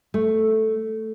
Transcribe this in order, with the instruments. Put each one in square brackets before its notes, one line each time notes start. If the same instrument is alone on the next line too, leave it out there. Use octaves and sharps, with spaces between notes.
[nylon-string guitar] A3